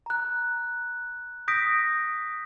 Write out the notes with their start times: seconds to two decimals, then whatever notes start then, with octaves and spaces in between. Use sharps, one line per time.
0.06 A#5 F#6
1.48 D#6 G6 A#6 B6 D7